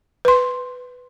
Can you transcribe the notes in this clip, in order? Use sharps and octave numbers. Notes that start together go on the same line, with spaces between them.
B4 C6